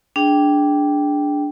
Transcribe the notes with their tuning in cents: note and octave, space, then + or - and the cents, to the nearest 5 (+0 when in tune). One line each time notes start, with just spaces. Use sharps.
D4 -5 G#4 +0 G5 +0